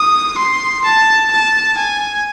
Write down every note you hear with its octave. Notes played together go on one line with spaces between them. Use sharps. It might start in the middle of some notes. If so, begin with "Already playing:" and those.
Already playing: D#6
C6
A5
A5
G#5